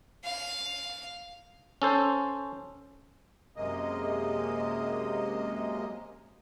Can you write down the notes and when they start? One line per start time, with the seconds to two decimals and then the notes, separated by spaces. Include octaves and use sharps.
0.24 F5
1.82 C#4 A4 C5
3.56 F#2 C3 G#3 A#3 D#5